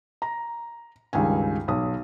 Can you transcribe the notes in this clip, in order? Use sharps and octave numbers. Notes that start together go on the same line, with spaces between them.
A#5
C#2 G2 D#3 G#5
B1 D#6